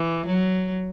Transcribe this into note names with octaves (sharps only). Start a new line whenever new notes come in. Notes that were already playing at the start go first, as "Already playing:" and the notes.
Already playing: E3
F#3